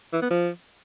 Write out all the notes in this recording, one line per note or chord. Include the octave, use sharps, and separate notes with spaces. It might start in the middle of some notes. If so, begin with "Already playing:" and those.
E3
B3
F3